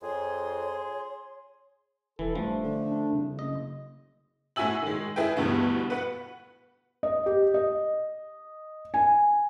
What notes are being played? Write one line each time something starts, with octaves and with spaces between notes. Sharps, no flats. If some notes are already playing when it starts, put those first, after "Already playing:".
F2 G#4 C#5 C6
E1 E3 A4
G2 F3 A3 D4
D3
D4
C2 C#3
F#1 D#5
A2 E4 F#4 G#5 E6 F#7
D#3 G#3
E4 G#4 B4 G5
D2 G2 B2 E3 B3
B4 F#5
D#5
G4
D#5
G#5